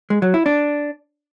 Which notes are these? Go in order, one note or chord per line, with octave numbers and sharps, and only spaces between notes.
G#3
F#3
E4
D4